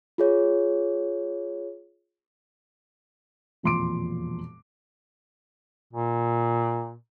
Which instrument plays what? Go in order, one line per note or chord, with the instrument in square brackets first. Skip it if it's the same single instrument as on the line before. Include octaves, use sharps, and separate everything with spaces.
[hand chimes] F4 G#4 C#5
[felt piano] E1 F2 A#2 C6 D6 D7
[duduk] A#2